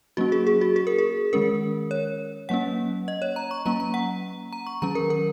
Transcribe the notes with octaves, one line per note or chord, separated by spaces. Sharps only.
F#3 A#3 C#4 F#4
G#4
G#4
F#4
G#4
A#4
G#4
D#3 G#3 C#4 A#4
C#5
F#3 A#3 C#4 F#5
D#5
C#5
A#5
C#6
F#3 A#3 C#4 A#5
A#5
F#5
A#5
C#6
D#3 F#3 C#4 A#5
A#4
A#4